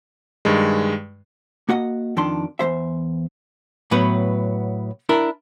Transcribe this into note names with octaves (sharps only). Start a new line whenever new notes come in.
G2 D#3 G#3
A#3 F#4 D#5 F#5
F2 D#3 D4 C6
E2 F#3 C5 E5
A2 F#3 B3 B4
D4 E4 A#4